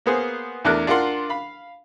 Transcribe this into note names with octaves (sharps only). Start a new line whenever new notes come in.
A#3 B3 G#4 C5
E2 A3 D4 A#4 F#6
D4 F4 A#4 F#5 C6
F5 B5